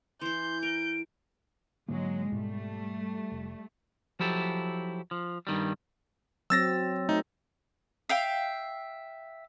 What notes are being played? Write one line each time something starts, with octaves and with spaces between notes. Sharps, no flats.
E3 E4 C6 G6
A#4 D7
G#2 D3 F#3 G#3 A#3
G#2 B2 G3 A3
F1
F3 F#3 E4 G4 A4
F3
G2 D#3 G3
F#3 C4 E6 A6 A#6
A3 D#4
E5 F5 G5